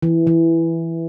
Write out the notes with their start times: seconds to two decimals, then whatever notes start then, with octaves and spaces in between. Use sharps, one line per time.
0.03 E3
0.27 E3